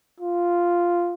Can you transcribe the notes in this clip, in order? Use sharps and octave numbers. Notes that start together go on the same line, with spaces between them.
F4